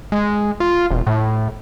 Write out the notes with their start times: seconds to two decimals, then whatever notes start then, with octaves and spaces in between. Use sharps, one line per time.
0.12 G#3
0.60 F4
0.90 E1
1.07 A2